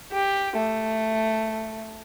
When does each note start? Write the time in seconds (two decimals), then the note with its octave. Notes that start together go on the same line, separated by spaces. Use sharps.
0.11 G4
0.57 A3